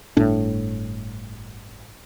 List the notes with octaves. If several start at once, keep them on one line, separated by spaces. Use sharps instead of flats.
G1 A2 D4